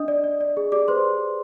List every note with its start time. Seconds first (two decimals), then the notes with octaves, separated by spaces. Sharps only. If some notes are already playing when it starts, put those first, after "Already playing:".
Already playing: D4 D#5 D#6
0.08 D5
0.24 D5
0.40 D5
0.57 G#4
0.72 G4 D5 D6
0.88 B4 C5 C6